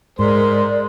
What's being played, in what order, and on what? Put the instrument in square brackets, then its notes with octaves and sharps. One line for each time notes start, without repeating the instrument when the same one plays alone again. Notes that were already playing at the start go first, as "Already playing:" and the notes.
[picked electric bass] G#2 [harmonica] G#3 C5 [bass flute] A#4 [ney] D5